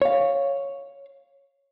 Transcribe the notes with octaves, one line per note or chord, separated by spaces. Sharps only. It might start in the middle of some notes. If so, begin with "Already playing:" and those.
C#5 F5